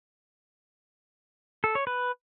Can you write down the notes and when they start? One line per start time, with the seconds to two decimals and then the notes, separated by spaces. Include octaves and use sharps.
1.64 A4
1.75 C#5
1.87 B4